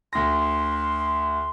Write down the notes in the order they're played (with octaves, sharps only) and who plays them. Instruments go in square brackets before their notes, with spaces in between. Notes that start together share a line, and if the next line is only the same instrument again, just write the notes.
[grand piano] D2 A#6 [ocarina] C6